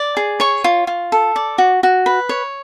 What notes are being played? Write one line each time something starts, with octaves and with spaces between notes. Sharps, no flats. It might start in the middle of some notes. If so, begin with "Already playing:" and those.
Already playing: D5
G#4
C#5 C#6
F4
F4
A4
D5
F#4
F#4
B4
C#5